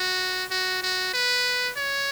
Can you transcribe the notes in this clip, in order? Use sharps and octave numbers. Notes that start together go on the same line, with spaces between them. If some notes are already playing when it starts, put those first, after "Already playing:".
Already playing: F#4
F#4
F#4
B4
C#5